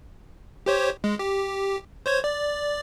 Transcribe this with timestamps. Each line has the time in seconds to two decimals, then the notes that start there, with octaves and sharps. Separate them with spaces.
0.66 G4 C5 C#5
1.04 G#3
1.19 G4
2.06 C5 C#5 G#6
2.24 D5